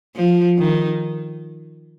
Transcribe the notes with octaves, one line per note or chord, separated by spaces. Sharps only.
F3
D#3